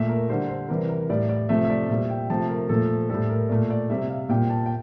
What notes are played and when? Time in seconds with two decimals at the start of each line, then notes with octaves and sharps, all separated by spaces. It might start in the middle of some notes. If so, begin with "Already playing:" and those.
Already playing: A#2 A3 E5
0.09 A#4
0.29 D3 G3 C5
0.49 C5
0.69 C3 E3 G3 A#4
0.89 A#4
1.10 A2 G3 D5
1.29 D5
1.49 C3 F3 A3 E5
1.65 E5
1.70 D5
1.89 A#2 G3 E5
2.10 G5
2.30 C3 F3 A3 A5
2.49 A#4
2.69 A#2 F3 A3 A4
3.10 A2 G3 A4
3.29 A#4
3.49 A#2 A3 D5
3.70 D5
3.90 C3 G3 E5
4.10 F5
4.29 A#2 G3 G5
4.50 A5
4.66 G5